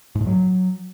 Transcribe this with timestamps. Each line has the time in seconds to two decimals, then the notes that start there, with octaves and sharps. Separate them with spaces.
0.15 G#2
0.21 A2
0.26 F#3